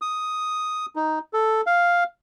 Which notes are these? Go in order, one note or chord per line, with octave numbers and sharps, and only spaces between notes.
D#6
D#4
A4
F5